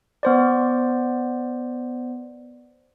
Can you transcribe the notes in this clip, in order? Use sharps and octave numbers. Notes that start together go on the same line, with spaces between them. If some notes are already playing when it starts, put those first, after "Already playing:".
B3 C5 D5